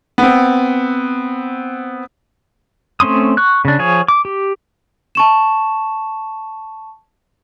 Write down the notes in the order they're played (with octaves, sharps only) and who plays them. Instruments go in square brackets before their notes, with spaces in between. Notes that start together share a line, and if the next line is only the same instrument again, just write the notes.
[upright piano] B3 C4
[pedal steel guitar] A3 C4 C#4 C6 D#6
C#6 F#6
C#3 D4
F3 G#4 C#5
D6
G4
[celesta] A5 C#6 E7